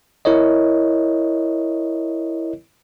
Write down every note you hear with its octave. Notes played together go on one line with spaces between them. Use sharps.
E4 A#4 C#5 D#5